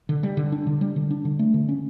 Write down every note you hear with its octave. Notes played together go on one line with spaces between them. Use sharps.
D3
G3
D3
D4
D3
G3
D3
D4
D3
A3
D3
C#4